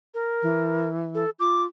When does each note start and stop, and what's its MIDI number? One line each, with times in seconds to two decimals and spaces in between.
0.14 0.88 70
0.43 1.24 52
1.15 1.30 69
1.40 1.67 65
1.40 1.63 86